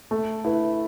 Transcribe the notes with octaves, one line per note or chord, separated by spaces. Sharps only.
A3
E4 B4